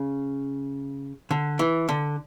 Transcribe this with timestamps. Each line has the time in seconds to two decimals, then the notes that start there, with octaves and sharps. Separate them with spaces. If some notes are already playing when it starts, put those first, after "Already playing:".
Already playing: C#3
1.31 D3
1.59 E3
1.89 D3